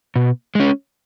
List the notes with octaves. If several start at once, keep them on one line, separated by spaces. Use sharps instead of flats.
B2
G#3 C#4